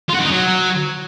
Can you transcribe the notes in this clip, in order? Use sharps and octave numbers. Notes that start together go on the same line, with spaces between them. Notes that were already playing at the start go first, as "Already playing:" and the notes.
F4
F#4
D#3
D#4
F#3